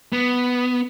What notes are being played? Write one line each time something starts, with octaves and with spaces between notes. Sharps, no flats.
B3